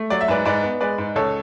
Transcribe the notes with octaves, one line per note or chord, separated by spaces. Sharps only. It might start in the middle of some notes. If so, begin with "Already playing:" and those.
Already playing: A3
F#3 D5
E5
G#2 B4 D5
G#2 B4 D5
B3
G#3 B4 D5
G#2
C#2 A4 C#5